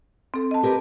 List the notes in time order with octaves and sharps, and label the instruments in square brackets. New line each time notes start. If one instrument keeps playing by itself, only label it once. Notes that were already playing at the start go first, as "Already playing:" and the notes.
[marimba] C4 A4
D#5 A5
[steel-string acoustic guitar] G4 A#4 B4